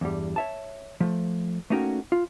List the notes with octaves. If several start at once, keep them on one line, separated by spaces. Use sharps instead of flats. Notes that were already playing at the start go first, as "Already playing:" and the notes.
E2 G2 G3
C#5 E5 A5
F3 A3
A3 A#3 C#4 D#4 F#4 G5
F4